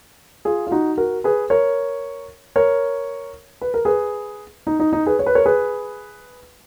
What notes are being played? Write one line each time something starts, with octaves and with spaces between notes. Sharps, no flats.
F4 G#4
F4
D#4 F#4
F#4 A#4
G#4 B4
A#4 C#5
A#4 C#5
B4
A#4
G#4 B4
D#4
D#4
D#4
G#4 B4
C#5
B4
A#4 C#5
G#4 B4